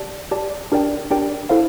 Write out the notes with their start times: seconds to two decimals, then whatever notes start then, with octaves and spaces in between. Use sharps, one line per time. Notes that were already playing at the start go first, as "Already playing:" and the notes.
Already playing: G4 D5 A5
0.31 G4 D5 A5
0.72 D4 G4 A#4 D5 G5
1.11 D4 G4 A#4 D5 G5
1.49 E4 A4 C5 F5